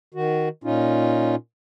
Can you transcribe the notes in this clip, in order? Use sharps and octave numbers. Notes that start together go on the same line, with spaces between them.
D#3 F#4
A#2 C#4 D#4 F4